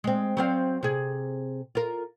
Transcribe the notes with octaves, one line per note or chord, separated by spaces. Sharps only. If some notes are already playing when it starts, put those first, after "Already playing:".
G#3 C4
F#3 C4 F5
C3 G#4
F4 A#4